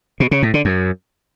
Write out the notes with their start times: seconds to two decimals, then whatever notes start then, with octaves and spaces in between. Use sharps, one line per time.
0.20 B2
0.31 C#3
0.43 A2
0.54 D3
0.65 F#2